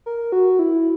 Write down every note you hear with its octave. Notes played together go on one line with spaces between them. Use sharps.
A#4
F#4
E4